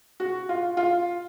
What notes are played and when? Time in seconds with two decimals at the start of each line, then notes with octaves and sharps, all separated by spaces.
0.20 F#4
0.49 F4
0.77 F4